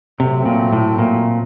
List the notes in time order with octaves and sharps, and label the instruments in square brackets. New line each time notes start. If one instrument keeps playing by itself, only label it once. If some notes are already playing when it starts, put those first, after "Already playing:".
[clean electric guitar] C3 [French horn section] F#3 A3 C4
[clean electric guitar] A#2
A2
A#2